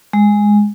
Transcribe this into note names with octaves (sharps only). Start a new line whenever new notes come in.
G#3